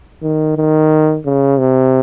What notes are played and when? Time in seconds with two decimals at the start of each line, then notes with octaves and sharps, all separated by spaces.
0.23 D#3
0.57 D#3
1.26 C#3
1.59 C3